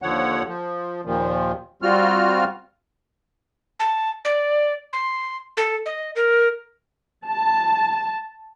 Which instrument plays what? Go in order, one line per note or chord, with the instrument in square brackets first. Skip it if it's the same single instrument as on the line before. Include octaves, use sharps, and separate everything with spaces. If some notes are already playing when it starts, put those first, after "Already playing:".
[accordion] D#2 D3 F3 C#5 F#5
F3
D#2 A#2 D#3 F3
G3 C4 F4 F#4 F6
[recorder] A5
D5
C6
A4
D#5
A#4
[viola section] A5